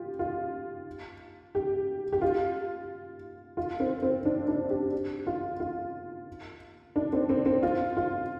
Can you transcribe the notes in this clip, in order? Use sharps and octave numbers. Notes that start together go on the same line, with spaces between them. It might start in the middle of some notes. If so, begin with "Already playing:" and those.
Already playing: F4 G4
F4
G4
G4
F4
F4
C4
C4
D4
D4
G4
F4
F4
D4
C4
C4
C4
F4
F4